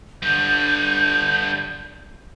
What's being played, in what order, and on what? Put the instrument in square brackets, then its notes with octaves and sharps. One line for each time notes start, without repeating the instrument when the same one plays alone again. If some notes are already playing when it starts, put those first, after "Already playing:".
[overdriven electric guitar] G2 D3 [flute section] G6